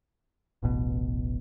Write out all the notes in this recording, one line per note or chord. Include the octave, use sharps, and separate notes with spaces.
D1 A1 B2